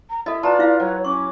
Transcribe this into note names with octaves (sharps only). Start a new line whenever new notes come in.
A#5
E4 A4 D#5 E5
F4 B4 D5 A5 A#5
E4 F5
F#3 C#5
C#4 C#6 D6